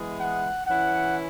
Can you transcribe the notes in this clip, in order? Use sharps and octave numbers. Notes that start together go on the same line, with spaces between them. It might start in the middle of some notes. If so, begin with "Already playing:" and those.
Already playing: E3 G#3 B3 E4
F#5
E3 C#4 E4 F#5